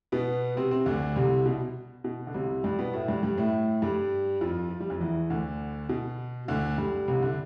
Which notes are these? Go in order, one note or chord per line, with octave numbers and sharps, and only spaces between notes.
B2 B3
C3 C4
C3 C4
D2 D3
C2 C3
B2
B2
D3
C2 C3
G2 G3
B2 B3
A2 A3
G2 G3
G2 G3
A2 A3
G2 G3
F2 F3
F3
G3
F2 F3
E2 E3
D2 D3
B2
D2 D3
G2 G3
C2 C3
D3